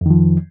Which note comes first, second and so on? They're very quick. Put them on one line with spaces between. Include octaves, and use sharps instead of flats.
F2 D#3 F3